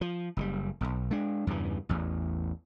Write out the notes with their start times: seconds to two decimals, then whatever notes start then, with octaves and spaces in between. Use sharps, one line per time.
0.01 F3
0.37 F#1 C3 G3
0.81 E1 B1
1.11 G#3 D4
1.47 E2 G2 C#3 E3
1.89 A1 E2